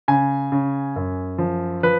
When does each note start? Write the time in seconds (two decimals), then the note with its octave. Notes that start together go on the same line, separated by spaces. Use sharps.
0.08 C#3 G#5
0.52 C#3
0.96 F#2
1.38 F3
1.83 F3 B4